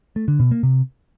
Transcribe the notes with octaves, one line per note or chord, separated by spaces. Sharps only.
A3
D3
B2
A#3
C3